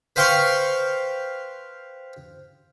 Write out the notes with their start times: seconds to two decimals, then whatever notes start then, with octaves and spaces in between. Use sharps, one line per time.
0.16 B4 C5 F5 G5 C6 C#6